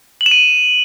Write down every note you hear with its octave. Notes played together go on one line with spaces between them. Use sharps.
F#7
E7
D#7